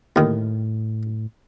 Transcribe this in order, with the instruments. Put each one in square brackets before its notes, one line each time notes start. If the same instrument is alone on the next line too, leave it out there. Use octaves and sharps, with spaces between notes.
[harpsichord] D#2 D#3 [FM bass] A2